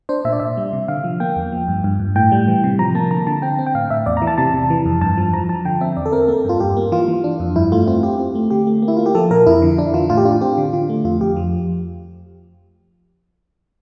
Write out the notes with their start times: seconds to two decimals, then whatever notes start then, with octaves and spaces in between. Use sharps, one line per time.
0.09 D4 C5
0.25 A#2 E5
0.33 D5
0.40 A#2 E5
0.57 G3
0.73 C3
0.88 D3 F5
1.04 F3
1.20 A#3 G5
1.36 E2
1.52 F3
1.68 G2
1.84 G2
2.00 G2
2.16 A2 G5
2.32 G3
2.48 E3
2.64 C3
2.79 F3 A#5
2.95 A#3 A5
3.11 D3 A#5
3.27 D3 A5
3.42 C4 G5
3.59 C4
3.66 G5
3.75 A2 F5
3.90 A2 E5
4.06 E2 D5
4.17 A#5
4.22 E3
4.27 A5
4.38 C3 A5
4.54 C3
4.70 E3
4.86 F2
5.01 G2 A5
5.18 F3
5.33 F3 A#5
5.49 F3 A5
5.65 D3 G5
5.81 C4 E5
5.97 E2 D5
6.06 A4
6.12 C4 A#4
6.28 A#3 A4
6.45 G2 F4
6.60 G2 G4
6.77 A#3
6.92 E3 F4
7.08 E3
7.24 D4
7.40 F2
7.56 G2 E4
7.72 A3 F4
7.87 C4 F4
8.03 C4 G4
8.19 C4
8.35 A3
8.51 D3 G4
8.67 A3
8.82 A#3
8.88 E4
8.97 A#3 F4
9.06 G4
9.15 F3 A4
9.31 A#2 A#4
9.47 F2 E4
9.62 D3
9.78 D4 E4
9.94 E3 F4
10.10 A2 F4
10.17 G4
10.25 D4 F4
10.41 C4 G4
10.58 D3
10.73 D3 F4
10.89 A3
11.05 F2 F4
11.21 F2 G4
11.36 F3